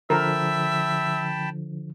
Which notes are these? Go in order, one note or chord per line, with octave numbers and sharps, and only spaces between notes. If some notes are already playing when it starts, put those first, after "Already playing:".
D3 F3 A#4 E5 G5 A5 B5